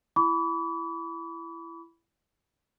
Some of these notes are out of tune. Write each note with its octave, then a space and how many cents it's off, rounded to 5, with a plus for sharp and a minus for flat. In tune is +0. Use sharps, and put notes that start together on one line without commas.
E4 +25 B5 +0 D6 -45